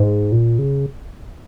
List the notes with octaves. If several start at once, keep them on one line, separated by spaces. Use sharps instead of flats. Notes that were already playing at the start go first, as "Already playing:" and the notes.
Already playing: G#2
A#2
C#3